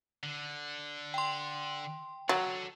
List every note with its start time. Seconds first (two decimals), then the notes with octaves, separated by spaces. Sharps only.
0.23 D3
1.14 G5 C6
2.29 F#3 A4 F#5